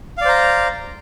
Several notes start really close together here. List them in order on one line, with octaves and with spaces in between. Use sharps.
F5 D5 C5 A#5